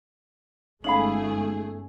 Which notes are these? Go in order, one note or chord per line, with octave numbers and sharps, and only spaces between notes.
G1 G#3 A3 C#4 D#4 G#4 F5 B5